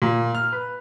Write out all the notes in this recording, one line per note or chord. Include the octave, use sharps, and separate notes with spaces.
A#2
F6
B4